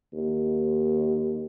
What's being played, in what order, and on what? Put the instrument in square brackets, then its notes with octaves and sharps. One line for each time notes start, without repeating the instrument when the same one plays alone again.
[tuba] D#2